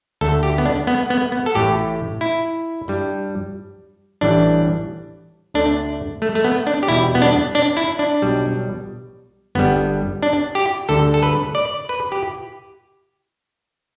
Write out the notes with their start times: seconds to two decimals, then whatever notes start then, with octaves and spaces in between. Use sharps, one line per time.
0.21 D2 D3 A3 A4
0.43 G4
0.58 B3
0.65 D4
0.87 B3
1.10 B3
1.32 B3
1.46 A4
1.55 A1 A2 A3 G4
2.21 E4
2.88 G2 G3
4.21 A1 A2 E3 G3 D4
5.54 D2 D3 A3 D4
6.22 A3
6.35 A3
6.44 B3
6.67 D4
6.83 G4
6.88 E2 B2 G3 E4
7.15 B3
7.22 D4
7.55 D4
7.77 E4
7.99 D4
8.22 B1 B2 G3
9.55 G1 G2 G3 B3
10.22 D4
10.55 G4
10.89 D2 D3 G3 A4
11.14 A4
11.23 B4
11.55 D5
11.89 B4
12.12 G4